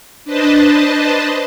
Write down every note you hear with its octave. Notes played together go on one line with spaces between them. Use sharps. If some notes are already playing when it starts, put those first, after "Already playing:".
D4 B4 C5 D#5 A5